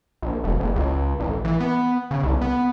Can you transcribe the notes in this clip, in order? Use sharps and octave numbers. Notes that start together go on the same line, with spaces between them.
A#1
E1
F#1
C#2
A1
E3
B3
C#3
C2
B3